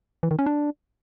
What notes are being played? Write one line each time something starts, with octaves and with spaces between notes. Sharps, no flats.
E3
D#3
C#4
D4